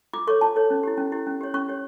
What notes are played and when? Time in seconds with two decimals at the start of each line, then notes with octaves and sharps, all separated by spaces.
0.13 F4 D6
0.27 A4 C#5 C#6
0.41 F4 A5
0.56 A4 C#5
0.70 C#4
0.83 E4 G4
0.97 C#4
1.12 E4 G4
1.27 C#4
1.41 G4 C#5
1.54 C#4 C#6
1.68 G4 C#5